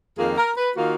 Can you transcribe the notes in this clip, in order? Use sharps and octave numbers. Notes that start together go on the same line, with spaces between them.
F2 D#3 A#3 F4 G#4
A#4
B4
D#3 A#3 F4 F#4